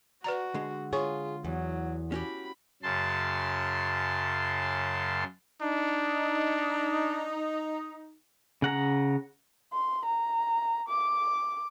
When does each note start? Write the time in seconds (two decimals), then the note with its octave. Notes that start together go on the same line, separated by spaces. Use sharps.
0.24 F#4 B4 D5 A#5
0.54 D3 G#3
0.93 F4 G#4 C#5 C#6
1.45 E2 F#3
2.12 C#4 F#4 G4 B5
2.83 F#2 C#3 A5 C6
5.61 D4 D#4
8.62 C#3 F#5 A#5
9.73 C6
10.06 A#5
10.89 D6